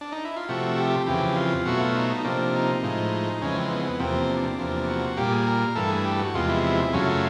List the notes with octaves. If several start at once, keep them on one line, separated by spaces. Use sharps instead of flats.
D4
D#4
E4
F4
C3 F3 A3 F#4
G4
F2 C#3 E3 G4
F4
B2 F#3 A3 F#4
F4
D#4
D#4
C3 F3 A#3 D4
D#4
A2 F3 G#3
F2 C#3 E3 G#3 C#4
C4
B3
B3
E2 C3 F3 A#3 C4
D4
E2 C3 F3 A#3
F#4
A#2 G3 A#3 G4
G#4
A#4
G2 E3 A3 A4
G#4
G4
F#4
E2 C3 F3 G#3 F4
E4
E4
F#2 C#3 F#3 A3 F4